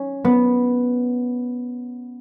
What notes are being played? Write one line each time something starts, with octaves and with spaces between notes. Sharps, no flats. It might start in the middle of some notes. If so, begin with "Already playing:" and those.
Already playing: C#4
B3